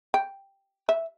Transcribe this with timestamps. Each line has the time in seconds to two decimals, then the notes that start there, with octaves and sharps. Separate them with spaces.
0.14 G5
0.89 E5